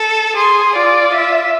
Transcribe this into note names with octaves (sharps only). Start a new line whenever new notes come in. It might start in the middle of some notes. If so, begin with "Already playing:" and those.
Already playing: A4
G#4 C6
F4 D5
E5